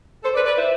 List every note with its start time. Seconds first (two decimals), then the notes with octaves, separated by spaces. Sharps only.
0.24 A4 C5
0.35 B4 D5
0.46 B4 D5
0.57 C5 E5